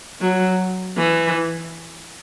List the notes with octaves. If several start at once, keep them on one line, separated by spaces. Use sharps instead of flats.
F#3
E3